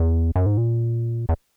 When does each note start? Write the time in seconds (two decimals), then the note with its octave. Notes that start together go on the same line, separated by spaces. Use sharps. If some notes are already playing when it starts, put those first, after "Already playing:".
Already playing: E2
0.36 F#2
0.46 G#2
0.57 A#2
1.29 E2